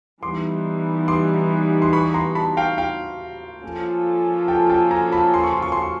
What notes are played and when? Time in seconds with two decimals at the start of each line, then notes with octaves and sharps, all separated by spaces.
0.22 E3 G3 B3 D#4 C6 D6
1.08 C6 D6
1.82 C6
1.93 B5 C#6
2.14 A#5 C6
2.35 A5 B5
2.57 F5 G5
2.78 F5 G5
3.63 F3 A#3 C#4 F4 A4
4.48 G5 A5
4.70 G5 A5
4.91 G#5 A#5
5.12 A5 B5
5.34 C6
5.43 C#6
5.53 C6
5.62 C#6
5.72 C6
5.82 C#6